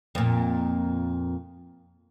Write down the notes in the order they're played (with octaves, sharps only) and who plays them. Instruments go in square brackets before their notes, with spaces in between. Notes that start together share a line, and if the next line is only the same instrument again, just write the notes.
[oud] F2 A#2